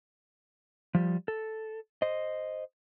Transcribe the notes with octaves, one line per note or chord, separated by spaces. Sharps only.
F3 G3
A4
C5 D#5